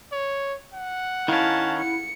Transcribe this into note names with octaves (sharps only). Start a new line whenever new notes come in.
C#5
F#5
D#3 C#4 E4 F5 A5
C#7